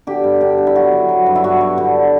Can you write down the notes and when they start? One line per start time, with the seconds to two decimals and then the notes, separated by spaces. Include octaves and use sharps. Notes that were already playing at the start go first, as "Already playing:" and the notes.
0.07 D3 G4
0.24 G2
0.41 D3 G4
0.58 D3
0.67 E4
0.75 F#3 F#4
0.92 F#3
1.09 F#3
1.26 G2
1.36 E4
1.44 G2 F#4
1.61 G2
1.78 D3